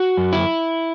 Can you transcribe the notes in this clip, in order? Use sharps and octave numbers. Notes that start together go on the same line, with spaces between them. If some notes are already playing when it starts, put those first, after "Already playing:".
Already playing: F#4
F#2
E4